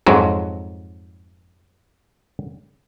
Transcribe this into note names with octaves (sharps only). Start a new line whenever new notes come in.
F2 G#2 F#3